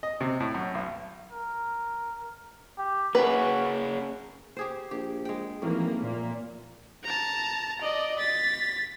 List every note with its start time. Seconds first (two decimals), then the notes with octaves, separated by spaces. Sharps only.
0.03 D#5
0.21 C3
0.40 A2
0.55 F#2
0.75 B1
1.32 A#4
2.78 G4
3.15 A#3 C#4 F#4 G#4 B4
4.57 G4 G#4 C5
4.91 A#1 G4
5.25 G#3 G5
5.62 G#1 A2 E3 F3 A#3
6.03 A#2 A#3
7.04 A5 A#5
7.81 D5 D#5
8.19 A6 B6